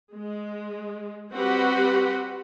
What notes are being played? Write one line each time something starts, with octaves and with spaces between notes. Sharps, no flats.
G#3
G3 C4 F#4 G4 B4 F#5